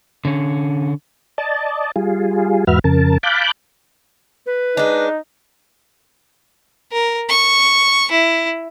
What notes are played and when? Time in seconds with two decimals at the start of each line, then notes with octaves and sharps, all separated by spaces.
0.25 D3 C#4
1.38 D5 D#5 A5
1.96 G3 F4 G#4
2.67 E2 G#2 F#4 B4 E5 F6
2.84 F2 C#3 A#4 A5
3.23 F5 A5 B5 D6 F#6 G6
4.46 B4
4.77 G#3 D4 D#4
6.93 A#4
7.29 C#6
8.11 E4